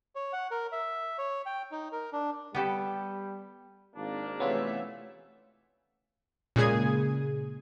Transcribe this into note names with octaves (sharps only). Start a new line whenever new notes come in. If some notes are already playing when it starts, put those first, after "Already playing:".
C#5
F#5
A#4
E5
C#5
G5
D#4
A#4
D4
G3 B3 G4 A4
G#1 A#3 D4
C3 E3 A3 B3 C#4 F4 C#5 E5
A#2 C#3 G#3 G#4 D#6 G#6